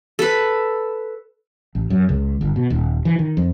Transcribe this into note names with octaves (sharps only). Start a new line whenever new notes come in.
A4 B4
A1
F#2
C#2
G1
B2
D#1
E3
D#3
F2